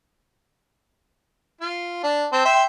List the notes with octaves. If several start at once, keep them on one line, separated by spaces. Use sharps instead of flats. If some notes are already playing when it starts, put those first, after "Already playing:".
F4
D4
C4 A5
E5 G5 C6